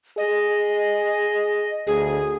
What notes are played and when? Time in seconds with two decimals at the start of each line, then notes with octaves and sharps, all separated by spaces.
0.18 G#4 D#5
1.87 D2 G#4